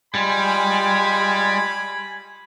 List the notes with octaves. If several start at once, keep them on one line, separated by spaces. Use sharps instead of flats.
G3 G#3 F4 G#5 B5